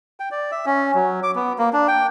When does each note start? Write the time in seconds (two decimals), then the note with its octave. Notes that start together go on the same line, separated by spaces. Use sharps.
0.20 G5
0.31 D5
0.52 E5
0.66 C#4
0.95 F#3
1.23 D6
1.36 B3
1.58 A#3
1.73 D4
1.88 G5